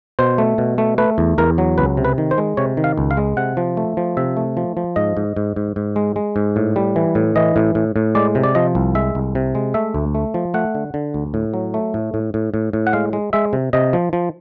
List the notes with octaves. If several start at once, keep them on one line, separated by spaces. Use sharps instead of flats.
B2 C5
A3
B2
A3
A3 B4
E2
E2 A#4
F#3
C#2 B4
C3
B4
D#3
C5
G#3
C3 C#5
D#3
F5
C#2
F5
G#3
C3 F#5
F3
A3
F3
C3 E5
A3
F3
F3
G#2 D#5
G#2
G#2
G#2
G#2
G#3
G#3
G#2
A2
G3
E3
A2
E3 D#5
A2
A2
A2
G#3 D5
C3
D5
F3 D#5
C2
G#3 E5
C2
C3
G#3
A3 E5
D2
A3
F3
A3 F#5
D3
D3
D2
A2
F#3
A3
A2
A2
A2
A2
A2
F#5
G#3 F5
G#3
G#3 E5
C3
C3 D#5
F3
F3